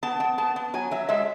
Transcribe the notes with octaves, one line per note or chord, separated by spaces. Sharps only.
B3 A5
B3
B3 A5
B3
F#3 G#5
F#3 E5
G#3 E5